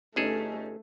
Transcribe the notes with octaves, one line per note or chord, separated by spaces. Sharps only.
G1 A3 C#4 D#4 G#4 A4